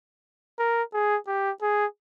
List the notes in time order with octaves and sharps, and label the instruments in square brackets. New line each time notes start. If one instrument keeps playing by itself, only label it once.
[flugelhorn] A#4
G#4
G4
G#4